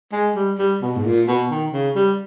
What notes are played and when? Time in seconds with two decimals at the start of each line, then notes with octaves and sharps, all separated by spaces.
0.12 G#3
0.36 G3
0.59 G3
0.82 B2
0.96 G#2
1.05 A#2
1.28 B2
1.51 D#3
1.73 C#3
1.96 G3